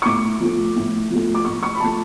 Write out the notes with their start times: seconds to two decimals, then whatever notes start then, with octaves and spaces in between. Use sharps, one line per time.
0.02 C#6
0.06 A2 D6
0.40 F3 A3
0.76 A2
1.10 F3 A3
1.35 D6
1.45 A2 C#6
1.63 C#6
1.75 B5
1.80 F3 A3 A5